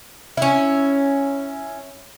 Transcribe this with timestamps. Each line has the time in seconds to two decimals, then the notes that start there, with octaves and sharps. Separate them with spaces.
0.37 C#4 E4